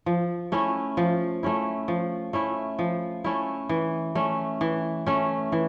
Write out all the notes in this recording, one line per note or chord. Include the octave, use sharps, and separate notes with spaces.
F3
A3 C#4 E4
F3
A3 C#4 E4
F3
A3 C#4 E4
F3
A3 C#4 E4
E3
A3 C#4
E3
A3 C#4
E3